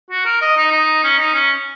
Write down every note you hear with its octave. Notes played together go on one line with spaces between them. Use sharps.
F#4
A#4
D#5
D#4
D#4
C#4
D#4
C#4